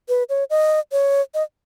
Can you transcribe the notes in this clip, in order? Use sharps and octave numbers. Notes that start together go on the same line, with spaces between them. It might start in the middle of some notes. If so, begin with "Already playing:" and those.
B4
C#5
D#5
C#5
D#5